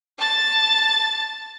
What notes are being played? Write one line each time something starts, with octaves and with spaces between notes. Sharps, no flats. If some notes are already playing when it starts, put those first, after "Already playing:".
A5 A6